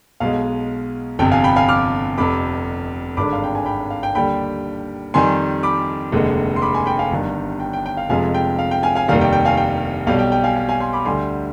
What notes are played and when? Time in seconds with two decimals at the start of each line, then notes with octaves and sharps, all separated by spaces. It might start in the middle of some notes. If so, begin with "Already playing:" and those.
0.20 B1 B2 G#3 F5
1.19 G1 F2 C3 G5
1.31 F5 G#5
1.44 G5 B5
1.56 F5 G#5
1.69 D6 F6
2.18 F1 F2 C3 B5 D6
3.17 G#1 G2 D3 G#3 B5 D6
3.33 F5
3.44 G5
3.55 G#5
3.66 G5 B5
3.91 F5
4.03 G5
4.15 D#2 D3 G3 G5 B5
5.14 F2 D#3 G3 G#5 C6
5.63 B5 D6
6.12 F1 D#2 D3 G#3
6.56 C6
6.62 B5 D6
6.74 G#5 C6
6.86 G5 B5
6.99 F5 G#5
7.11 G1 G2 D#3 G3
7.60 G5
7.73 G5
7.86 G5
7.97 F5
8.09 F1 F2 C3 F3 G#3 F5 G#5
8.34 G5
8.59 F5
8.71 G5
8.83 F5 G#5
8.95 F5 G#5
9.08 F1 D#2 D#3 G3 F5
9.21 G5
9.32 G5
9.45 F5 G#5
9.57 G5
10.07 B1 B2 G3 F5
10.19 G5
10.32 G5
10.44 F5 G#5
10.56 F5 G#5
10.69 F5 G#5
10.80 G#5 C6
10.93 B5 D6
11.05 D2 D3 G3 G#5 C6